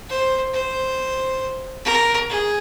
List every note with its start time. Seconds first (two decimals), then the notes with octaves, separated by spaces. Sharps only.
0.09 C5
0.53 C5
1.85 A#4
2.29 G#4